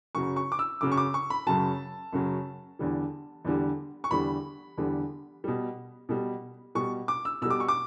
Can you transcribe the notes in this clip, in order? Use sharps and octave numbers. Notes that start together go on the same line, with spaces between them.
F#2 C#3 F#3 C#6
C#6
D6
E6
F#2 C#3 F#3 D6
C#6
D6
C#6
B5
F#2 C#3 F#3 A5
F#2 C#3 F#3
E2 D3 G3
E2 D3 G3
C#6
E2 D3 G3 B5
E2 D3 G3
B2 G3
B2 G3
B2 G3 C#6
D6
E6
B2 G3 E6
D6
C#6
D6